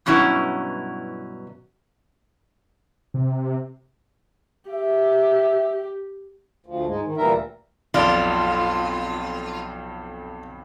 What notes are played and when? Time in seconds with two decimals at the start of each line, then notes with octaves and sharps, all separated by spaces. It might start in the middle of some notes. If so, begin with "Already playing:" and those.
0.06 G2 B2 F#3 C#4 E4
3.14 C3
4.70 G4 E5
6.66 D2 F3
6.87 G#2 G#3
7.05 D#3
7.17 D2 A#2 E3 G3 A#4 E5
7.94 B1 F2 F4 D5